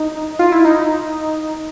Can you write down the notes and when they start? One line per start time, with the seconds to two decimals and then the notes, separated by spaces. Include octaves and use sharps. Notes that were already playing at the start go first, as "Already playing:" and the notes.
Already playing: D#4
0.39 F4
0.52 E4
0.65 D#4